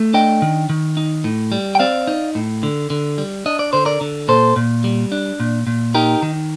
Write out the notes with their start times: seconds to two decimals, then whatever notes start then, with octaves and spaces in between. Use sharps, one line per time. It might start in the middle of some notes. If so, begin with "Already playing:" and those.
Already playing: A3
0.14 D4 D#5 G5
0.42 D#3
0.69 D#3
0.97 D#4
1.24 A2
1.52 G3
1.75 G5
1.79 C4 D5 F5
2.07 D#4
2.35 A2
2.63 D3
2.90 D3
3.18 G3
3.46 D4 D#5
3.59 D5
3.73 D3 C5
3.85 A#4 D5
4.01 D3
4.28 A#2 A4 C5
4.56 A#2
4.84 G3
5.12 D4
5.40 A#2
5.67 A#2
5.95 D#4 G4 A#4
6.22 D#3